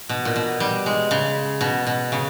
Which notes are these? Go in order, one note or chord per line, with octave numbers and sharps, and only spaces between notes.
B2
A#2
B2
G3
G#3
C#3
B2
B2
C#3